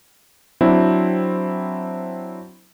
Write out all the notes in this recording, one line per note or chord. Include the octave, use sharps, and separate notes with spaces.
F#3 C4 D4 E4